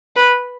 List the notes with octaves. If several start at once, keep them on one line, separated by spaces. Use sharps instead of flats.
B4